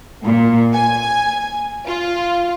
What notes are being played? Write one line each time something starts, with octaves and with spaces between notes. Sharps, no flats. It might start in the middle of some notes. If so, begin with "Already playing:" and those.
A#2
G#5
F4